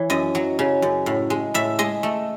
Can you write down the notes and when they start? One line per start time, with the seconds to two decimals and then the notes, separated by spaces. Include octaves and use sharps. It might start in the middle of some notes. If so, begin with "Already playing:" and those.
Already playing: E3 C#5
0.10 F#2 D#5
0.35 F#3
0.59 C#3
0.82 F#2
1.06 A2
1.30 G#3
1.54 A2 E5
1.79 G#3 D#5
2.03 A3